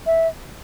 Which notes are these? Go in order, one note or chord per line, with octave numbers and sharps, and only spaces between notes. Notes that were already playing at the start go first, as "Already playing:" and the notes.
E5